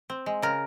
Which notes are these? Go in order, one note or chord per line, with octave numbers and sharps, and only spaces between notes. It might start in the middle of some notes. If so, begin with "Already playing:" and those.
C4
G#3
C#3 A#4